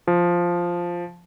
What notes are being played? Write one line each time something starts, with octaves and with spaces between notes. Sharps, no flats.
F3